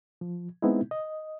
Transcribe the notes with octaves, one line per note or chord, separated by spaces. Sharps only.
F3
G#3 B3 C4 D#4 E4
D#5